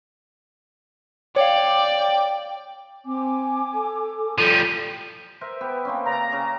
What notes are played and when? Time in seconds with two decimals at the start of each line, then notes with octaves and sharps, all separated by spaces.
1.36 C#5 D5 F5 G5
3.05 C4 G#5 D6
3.74 A4
4.38 F3 G3 D#7
5.41 A#4 C5 E5
5.61 B3 G4
5.85 A#3 C4 C#4
6.06 C#3 D5 A#5
6.32 C#3 C#4 G#4